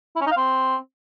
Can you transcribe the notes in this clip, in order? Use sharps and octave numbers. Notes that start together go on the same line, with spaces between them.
E4
C#4
D#4
F5
C4